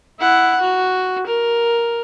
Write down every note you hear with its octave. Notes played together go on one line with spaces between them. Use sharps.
E4 F#5
F#4
A#4